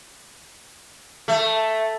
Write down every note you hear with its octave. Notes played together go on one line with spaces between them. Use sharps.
A3